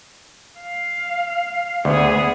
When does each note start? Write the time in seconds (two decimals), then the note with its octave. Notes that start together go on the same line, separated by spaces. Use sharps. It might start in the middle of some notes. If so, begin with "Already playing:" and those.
0.60 F5
1.85 D2 B3 G#4